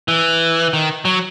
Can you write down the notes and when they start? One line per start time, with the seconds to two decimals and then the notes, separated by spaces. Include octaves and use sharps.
0.08 E3
0.73 D#3
1.05 F#3